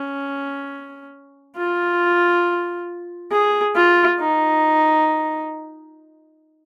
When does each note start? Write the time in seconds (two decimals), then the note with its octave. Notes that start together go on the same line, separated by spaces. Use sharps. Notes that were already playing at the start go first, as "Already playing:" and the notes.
Already playing: C#4
1.57 F4
3.32 G#4
3.76 F4
4.19 D#4